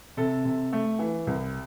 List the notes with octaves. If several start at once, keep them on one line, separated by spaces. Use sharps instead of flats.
C3 A4
C3
A3
E3
C2